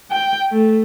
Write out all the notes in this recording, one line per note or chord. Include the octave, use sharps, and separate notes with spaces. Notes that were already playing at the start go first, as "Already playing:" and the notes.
G5
A3